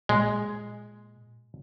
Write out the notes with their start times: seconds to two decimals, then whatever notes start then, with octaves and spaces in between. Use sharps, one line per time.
0.09 A#2 G#3